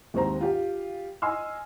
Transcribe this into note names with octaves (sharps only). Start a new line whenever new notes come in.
D#2 G#2 D#3 C4 A#5
F4 G4 F5
D#5 G#5 C6 E6 F6